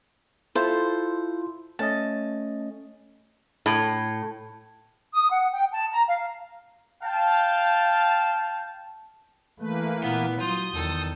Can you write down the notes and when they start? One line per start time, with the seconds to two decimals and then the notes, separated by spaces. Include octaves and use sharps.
0.55 E4 F4 A4 C5
1.79 A3 C#4 D#5 A5
3.66 A2
5.13 D#6
5.31 F#5
5.51 G5
5.71 A5
5.92 A#5
6.07 F5
7.04 F5 G5 A5
9.60 E3 A3 A#3 B4
10.02 A#2 B3 E4
10.39 F#3 F4 D#6 G6
10.74 E2 D#3 A4